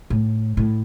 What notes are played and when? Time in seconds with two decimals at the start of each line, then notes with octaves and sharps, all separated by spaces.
0.10 A2
0.57 A2